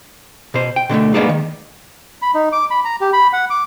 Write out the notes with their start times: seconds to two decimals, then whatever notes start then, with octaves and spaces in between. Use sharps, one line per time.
0.54 B2 C5
0.76 G5
0.89 B2 D3 G#3 A3
1.14 G#3 A#3 B3 D4 D#4 G#4
1.29 D#3
2.22 B5
2.34 D#4
2.52 D6
2.71 B5
2.85 A#5
3.01 G4
3.13 B5
3.33 F#5
3.50 D6